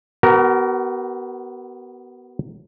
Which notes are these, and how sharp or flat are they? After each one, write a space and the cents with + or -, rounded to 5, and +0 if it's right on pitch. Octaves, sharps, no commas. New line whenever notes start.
B3 +0 F#4 +40 A#4 +0